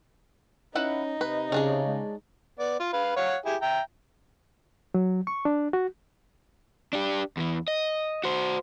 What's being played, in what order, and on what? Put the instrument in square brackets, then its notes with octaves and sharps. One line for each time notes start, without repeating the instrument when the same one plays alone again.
[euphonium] C#4 [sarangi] D#4 [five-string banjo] E4 B4 F#5
[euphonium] C3 [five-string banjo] B4
[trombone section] C#3 [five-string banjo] C#4 D4 G#4
[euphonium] G#3
[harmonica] B3 D5
F4 F5
B4 F5
C#5 F5 F#5
E4 G4 G#4
E5 G5 A#5
[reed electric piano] F#3
C#6
D4
F#4
[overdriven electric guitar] D4 G4
E2 E3
D#5
F#4 C5